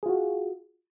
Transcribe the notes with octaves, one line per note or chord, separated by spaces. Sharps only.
F4 F#4 G#4